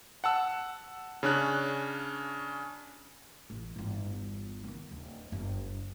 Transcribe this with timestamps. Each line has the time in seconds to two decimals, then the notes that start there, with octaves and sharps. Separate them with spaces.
0.24 F#5 A5 E6
1.23 C#3 C#4 D4 F#6
3.50 A1
3.76 G1 E2
4.64 D#3 B3
4.91 D1
5.32 F#1